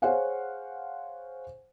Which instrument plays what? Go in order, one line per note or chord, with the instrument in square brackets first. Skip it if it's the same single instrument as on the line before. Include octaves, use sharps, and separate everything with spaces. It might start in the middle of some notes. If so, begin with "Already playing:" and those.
[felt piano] G#4 C5 C#5 F5 F#5 G#5